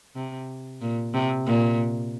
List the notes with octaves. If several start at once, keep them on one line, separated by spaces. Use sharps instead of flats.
C3
A#2
C3
A#2